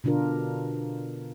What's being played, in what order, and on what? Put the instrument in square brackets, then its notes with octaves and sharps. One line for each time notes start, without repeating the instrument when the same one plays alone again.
[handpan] B2 D3 D4 F4 A#4